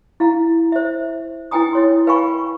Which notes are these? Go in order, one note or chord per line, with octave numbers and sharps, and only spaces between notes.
E4 F5 A#5
C5 E5
E4 B4 G5 G#5 A#5 D#6
E4 C#5 C6
B4 F5 G5 G#5 B5 C#6